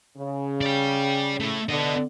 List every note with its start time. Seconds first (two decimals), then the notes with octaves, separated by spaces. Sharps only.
0.17 C#3
0.61 D5 G5
1.40 A3 E4
1.69 D3 B3 D#5